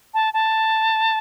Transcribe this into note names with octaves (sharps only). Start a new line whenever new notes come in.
A5
A5